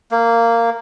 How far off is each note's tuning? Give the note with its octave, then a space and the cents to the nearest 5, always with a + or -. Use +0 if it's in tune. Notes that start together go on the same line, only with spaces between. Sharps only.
A#3 -10